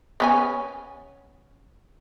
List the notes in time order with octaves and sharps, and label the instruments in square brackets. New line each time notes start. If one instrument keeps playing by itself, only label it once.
[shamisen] B3 C#4 G#5